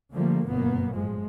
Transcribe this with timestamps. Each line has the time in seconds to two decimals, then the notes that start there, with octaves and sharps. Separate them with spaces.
0.13 D3 F3 G3 A3 A#3
0.49 G1 F#2 B2 A#3 B3
0.95 A2 F3 G#3